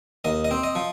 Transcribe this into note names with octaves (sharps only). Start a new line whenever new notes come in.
D#2 D#5
D#5
C4
D#5
F3